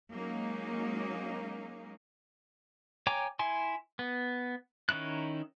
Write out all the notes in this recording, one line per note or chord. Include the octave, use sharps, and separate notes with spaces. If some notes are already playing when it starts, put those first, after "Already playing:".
F#3 G#3 A#3 C#4 D#4
C#5 G5 G#5 A#5 D6
E4 G#5 C6
B3
D#3 C#4 D#4 E4 F#6